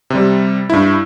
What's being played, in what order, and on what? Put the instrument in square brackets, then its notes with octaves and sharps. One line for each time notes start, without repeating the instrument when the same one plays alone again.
[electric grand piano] C3 G3
G2 E4